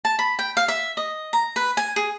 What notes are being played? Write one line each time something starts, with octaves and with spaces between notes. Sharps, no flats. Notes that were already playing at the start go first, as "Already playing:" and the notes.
A5
B5
G5
F5
E5
D#5
A#5
B4
G#5
G#4